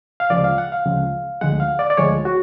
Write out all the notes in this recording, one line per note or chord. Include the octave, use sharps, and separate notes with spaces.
F5
D2 C#3 F3 G#3 D5
F5
F#5
F5
D2 C#3 F3 G#3
D2 D3 F3 G#3 F#5
F5
D5
D5
D2 D3 F3 G#3 C#5
F#4